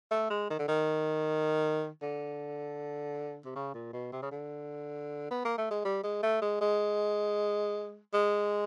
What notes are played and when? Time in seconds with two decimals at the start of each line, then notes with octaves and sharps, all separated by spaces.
0.11 A3
0.30 G#3
0.50 D#3
0.59 D3
0.68 D#3
2.02 D3
3.45 C3
3.55 C#3
3.74 A#2
3.93 B2
4.12 C3
4.22 C#3
4.31 D3
5.31 B3
5.45 A#3
5.58 A3
5.71 G#3
5.85 G3
6.04 G#3
6.23 A3
6.42 G#3
6.61 G#3
8.14 G#3